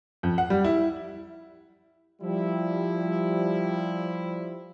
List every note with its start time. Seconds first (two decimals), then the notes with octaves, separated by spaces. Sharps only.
0.23 F2
0.38 F#5
0.50 G3
0.64 E4
2.22 F3 G3 E4